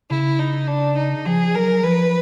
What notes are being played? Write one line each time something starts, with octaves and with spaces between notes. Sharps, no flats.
C#3 E4
D#4
D4
D#4
F3 G#4
F#3 A#4
F3 B4